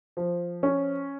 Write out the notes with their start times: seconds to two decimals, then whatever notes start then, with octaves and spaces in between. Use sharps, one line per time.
0.17 F3
0.63 C#4